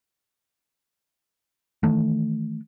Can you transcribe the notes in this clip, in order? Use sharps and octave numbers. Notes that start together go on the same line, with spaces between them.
D#3 E3 A3